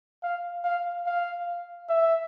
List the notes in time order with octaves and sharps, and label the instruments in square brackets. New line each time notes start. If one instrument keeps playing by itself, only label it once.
[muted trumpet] F5
F5
F5
E5